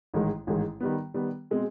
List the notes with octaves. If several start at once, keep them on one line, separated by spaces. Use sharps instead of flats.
A1 G#2 D#3 G#3
A1 G#2 D#3 G#3
D#3 G3 B3
D#3 G3 B3
B2 G#3 C4